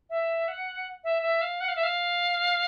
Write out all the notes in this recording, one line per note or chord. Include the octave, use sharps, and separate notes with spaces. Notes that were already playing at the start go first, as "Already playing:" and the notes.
E5
F#5
E5
E5
F5
F#5
F5
E5
F5